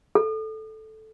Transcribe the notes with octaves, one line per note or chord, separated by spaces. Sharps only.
A4